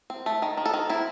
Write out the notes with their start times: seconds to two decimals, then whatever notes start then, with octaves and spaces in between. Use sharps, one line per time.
0.10 C4
0.26 A3
0.42 D#3
0.57 D#3
0.66 A4
0.73 D#3
0.90 C4 E4